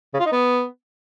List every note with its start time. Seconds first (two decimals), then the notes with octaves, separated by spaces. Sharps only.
0.14 C#3
0.20 F4
0.26 D#4
0.32 B3